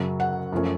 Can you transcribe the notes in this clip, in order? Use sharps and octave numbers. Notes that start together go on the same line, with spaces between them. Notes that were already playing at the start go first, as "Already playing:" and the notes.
Already playing: F#2 C#3 F#3
F#5
F#2 F3 A3 C#4